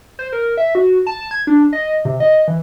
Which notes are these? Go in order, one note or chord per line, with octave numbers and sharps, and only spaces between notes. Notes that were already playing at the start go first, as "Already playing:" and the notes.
C5
A#4
E5
F#4
A5
G#6
D4
D#5
C3
D#5
E3